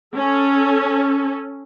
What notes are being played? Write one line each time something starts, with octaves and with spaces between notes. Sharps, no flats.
C#4 A4